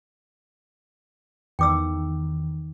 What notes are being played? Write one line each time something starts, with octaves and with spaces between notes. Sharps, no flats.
E2 D#3 G5 D6 E6